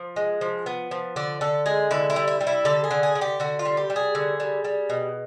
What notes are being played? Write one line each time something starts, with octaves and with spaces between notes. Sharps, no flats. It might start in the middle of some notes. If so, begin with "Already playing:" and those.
Already playing: F3
G#3
F3
B3
F3
D3 D5
D3 A4
G#3 G#4
D3 E4
E4
G3
E4
G3
E4
D3 A4
G#4
D3
G#4
D3
G4
D3 F#4
F4
G3
G4
G3
G#4
D3
G3
G3
B2